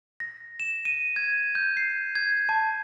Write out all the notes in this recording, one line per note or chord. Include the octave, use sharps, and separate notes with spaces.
A#6
E7
D#7
G#6
G6
C7
G#6
A5